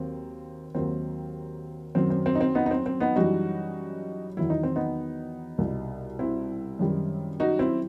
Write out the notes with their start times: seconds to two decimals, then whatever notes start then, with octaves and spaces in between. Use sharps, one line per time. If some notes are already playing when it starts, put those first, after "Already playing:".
Already playing: D#2 D#3 F#3 C4
0.75 D#2 D#3 F#3 C4
1.95 F#2 D#3 F#3 C4
2.10 C4
2.26 C4
2.35 D#4
2.41 C4
2.55 B3 D#4
2.66 D#4
2.71 C4
2.86 C4
3.00 B3 D#4
3.16 F#2 E3 G3 D#4 F#4
4.37 E2 D#3 F#3 E4
4.50 D#4
4.63 C4
4.76 B3 D#4
5.58 C2 B2 G3
6.19 C4 E4
6.79 F#2 D#3 G3
7.40 D#4 F#4
7.59 C4 E4